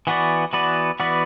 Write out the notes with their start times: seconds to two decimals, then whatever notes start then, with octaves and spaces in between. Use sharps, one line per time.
0.07 E3 B3 F#4 B4 D5
0.53 E3 B3 F#4 B4 D5
1.00 E3 B3 F#4 B4 D5